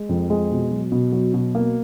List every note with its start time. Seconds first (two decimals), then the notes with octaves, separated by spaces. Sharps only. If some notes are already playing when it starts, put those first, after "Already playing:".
Already playing: G#3
0.09 F2
0.30 G#3
0.51 B2
0.71 F#3
0.92 B2
1.12 F#3
1.34 B2
1.55 A#3